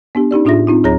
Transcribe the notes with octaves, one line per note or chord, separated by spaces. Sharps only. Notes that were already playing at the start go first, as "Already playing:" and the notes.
B3 D4 G4
C#4 D#4 G4 D5
A2 D4 F4 G#4 E5 A#6
C4 D#4 F4
D2 F#3 G#4 C#5 A#5 A#6